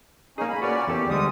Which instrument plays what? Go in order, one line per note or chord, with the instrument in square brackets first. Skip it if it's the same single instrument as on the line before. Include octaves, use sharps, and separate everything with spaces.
[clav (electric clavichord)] A#3 G#4 [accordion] C#4 D#4
[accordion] B5
[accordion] A#2 C#4 D5 [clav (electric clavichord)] F#4 B4 C#5
[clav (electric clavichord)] E2 A4 [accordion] G4
[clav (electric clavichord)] D2 G3 [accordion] G#3 D#6